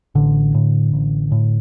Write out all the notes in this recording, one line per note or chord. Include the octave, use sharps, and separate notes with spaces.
A1 D3
A2
A1
A2